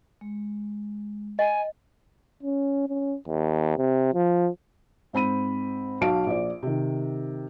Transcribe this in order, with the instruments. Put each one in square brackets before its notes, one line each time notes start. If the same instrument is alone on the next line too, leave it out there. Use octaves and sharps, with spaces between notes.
[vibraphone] G#3
[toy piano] D#5 [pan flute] G#5
[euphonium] C#4
C#4
D#2
C3
F3
[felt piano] G#2 C4 B5 D#7
B1 F#4 F5 A5 D7
A#1 D5
C3 D#3